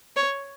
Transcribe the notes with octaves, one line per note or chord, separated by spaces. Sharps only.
C#5